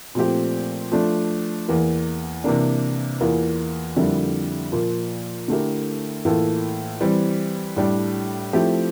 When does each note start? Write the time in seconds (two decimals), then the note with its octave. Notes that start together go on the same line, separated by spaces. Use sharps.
0.15 A#2 F3 A3 C4 G4
0.92 F3 A3 D4
1.68 E2 E3 A#3
2.44 C3 E3 A#3 D4
3.20 E2 E3 A#3 F4 A#4
3.96 F2 D3 G3 A#3 E4
4.72 A#2 F3 A#3
5.48 D3 A3 E4 G4 A#4
6.25 A2 E3 A#3 F4 A4
7.01 E3 G3 C4
7.77 A2 G3 D4
8.53 F3 A3 C4 E4 G4